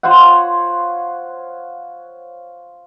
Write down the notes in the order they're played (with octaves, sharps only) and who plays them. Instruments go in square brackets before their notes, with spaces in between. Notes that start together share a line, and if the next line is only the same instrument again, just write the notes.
[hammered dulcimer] F4 C5 C#5 F#5